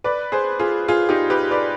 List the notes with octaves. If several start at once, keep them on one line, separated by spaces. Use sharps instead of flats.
B4 D5
G#4 C5
F4 G#4
F4 G#4
D#4 G4
G4 B4
B4 D5